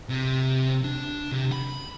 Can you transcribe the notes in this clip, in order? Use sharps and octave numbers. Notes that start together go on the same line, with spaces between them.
C3
D4
C3
B5